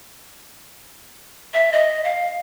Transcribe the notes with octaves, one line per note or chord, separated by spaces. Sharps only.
E5
D#5
F5